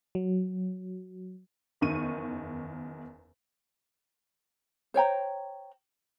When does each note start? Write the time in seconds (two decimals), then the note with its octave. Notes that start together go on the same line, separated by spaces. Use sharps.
0.15 F#3
1.81 F#1 E2 D#3 C#6 D#7
4.94 C5 C#5 G5 A#5